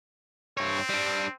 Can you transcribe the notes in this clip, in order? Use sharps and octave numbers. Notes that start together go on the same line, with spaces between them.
G2 C4 C#5
G3 D4